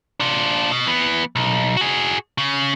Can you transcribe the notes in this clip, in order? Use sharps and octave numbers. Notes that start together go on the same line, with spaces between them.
D4 F4
B2
E3 B3
B1
F#4 G#4
C#3